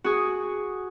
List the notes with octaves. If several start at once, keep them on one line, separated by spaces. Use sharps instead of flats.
F#4 G#4